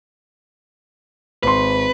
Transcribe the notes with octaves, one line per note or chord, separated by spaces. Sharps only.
G#1 B4 C6